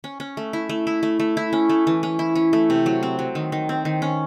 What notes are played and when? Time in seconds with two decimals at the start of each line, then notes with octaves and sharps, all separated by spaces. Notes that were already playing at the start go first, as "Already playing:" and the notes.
0.04 C#4
0.20 C#4
0.37 A3
0.53 E4
0.69 A3
0.87 E4
1.03 A3
1.20 A3
1.37 E4
1.53 C#4
1.69 A3
1.87 E3
2.03 C#4
2.19 E4
2.35 C#4
2.53 A3
2.70 C3
2.86 F#3
3.03 C4
3.19 F#3
3.35 D#3
3.52 D#3
3.69 C4
3.85 D#3
4.02 C#4